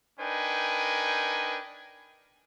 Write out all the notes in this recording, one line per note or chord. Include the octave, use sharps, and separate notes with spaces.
D4 D#4 A#4 B4 G5 G#5